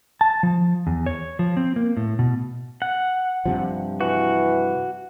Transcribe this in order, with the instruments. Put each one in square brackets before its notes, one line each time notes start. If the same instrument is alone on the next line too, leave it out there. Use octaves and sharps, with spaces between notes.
[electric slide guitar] A5
F3
E2
C#5
F3
C4
A#3
A2
B2
[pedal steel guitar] F#5
[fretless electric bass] G2 C3 F3
[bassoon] E3 [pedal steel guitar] F#4